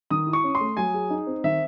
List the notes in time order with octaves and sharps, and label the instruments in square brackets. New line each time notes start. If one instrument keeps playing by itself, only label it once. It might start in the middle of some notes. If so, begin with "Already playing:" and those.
[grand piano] D#3 [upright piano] D#6
[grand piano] E4
[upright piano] C#6
[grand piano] C#4
[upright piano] C6
[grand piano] A3
[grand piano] F#3 [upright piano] G#5
[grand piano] G#4
D#4
C4
[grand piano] D#3 [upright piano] E5